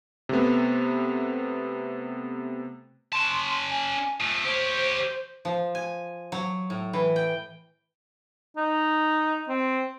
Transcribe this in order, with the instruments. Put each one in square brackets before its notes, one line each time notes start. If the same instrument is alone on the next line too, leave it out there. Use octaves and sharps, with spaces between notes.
[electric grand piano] C3 A3 B3
[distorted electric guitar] C#4 A5 [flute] C6
[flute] G#5
[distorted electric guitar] F3 A3
[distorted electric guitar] G4 C#5 [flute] C5
[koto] F3
G#5
F#3
A2
E3
G5
[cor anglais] D#4
C4